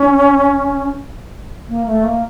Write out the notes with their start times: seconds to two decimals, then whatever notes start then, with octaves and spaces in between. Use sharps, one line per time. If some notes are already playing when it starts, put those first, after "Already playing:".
Already playing: C#4
1.68 A#3
1.86 A3
2.03 A#3